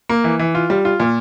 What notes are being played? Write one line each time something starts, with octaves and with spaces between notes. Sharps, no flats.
A#3
E3
E3
F4
G3
F4
A#2